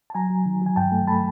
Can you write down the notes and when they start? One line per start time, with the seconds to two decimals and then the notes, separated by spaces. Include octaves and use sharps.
0.10 A5
0.15 F#3 G#5 A#5
0.30 F#3
0.46 D#3
0.61 F#3
0.66 G#5
0.76 G2 G5 A5
0.92 A3
1.07 A3 A5 B5